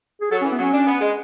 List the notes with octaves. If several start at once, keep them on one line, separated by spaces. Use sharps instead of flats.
G#4
F#3 A4
C#4
E3
B3
F#3 C#4
D4
B3
G#3